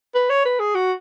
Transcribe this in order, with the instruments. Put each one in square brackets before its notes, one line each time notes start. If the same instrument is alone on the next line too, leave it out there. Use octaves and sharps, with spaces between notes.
[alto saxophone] B4
C#5
B4
G#4
F#4